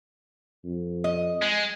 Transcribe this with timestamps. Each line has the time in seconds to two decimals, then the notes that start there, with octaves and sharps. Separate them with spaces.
0.65 F2
1.04 D#5
1.42 G#3